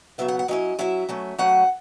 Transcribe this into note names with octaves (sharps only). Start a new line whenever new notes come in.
C#3 F#3 B3 E5
F#5
F#5
F#3 C#4 E4 D#5
F#3 C#4 E4 E5
F#3 A3 C#4
F#3 A3 C#4 F#5